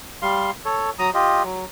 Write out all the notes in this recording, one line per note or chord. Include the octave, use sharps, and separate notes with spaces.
G3 F5 C6
A4 C#5
F#3 A#5 D#6
F4 G4 D#5
F#3